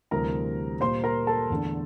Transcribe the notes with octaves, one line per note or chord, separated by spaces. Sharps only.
D2 C3 E3 G3 C4 A#4 A#5
A#2 G3 A#3 C5 C6
A#4 A#5
A4 A5
E2 D3 A3